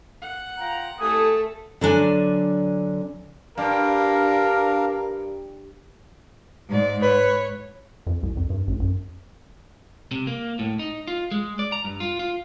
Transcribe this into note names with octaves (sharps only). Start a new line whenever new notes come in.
F#5
F4 G5 A#5
C2 A3 A4 G#5 D#6
D3 F#3 D4 G#5
G2 D4 A#4 F5
G#2 D5
B4 C#5
F2
C2
F2
G2
A1
F#2
C3
A#3
A2
D#4
F4
G#3
D5
A#5
G2
F4
F4